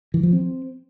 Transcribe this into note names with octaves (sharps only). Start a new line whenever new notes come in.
E3
F3
C4